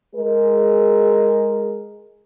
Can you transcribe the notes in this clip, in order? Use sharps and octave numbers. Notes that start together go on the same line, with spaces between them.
G#3 G#4 A#4